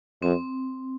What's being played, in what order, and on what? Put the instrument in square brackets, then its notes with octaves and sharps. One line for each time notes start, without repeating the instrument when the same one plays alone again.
[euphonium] F2 [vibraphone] C4